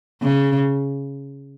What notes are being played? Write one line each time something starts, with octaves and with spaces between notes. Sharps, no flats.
C#3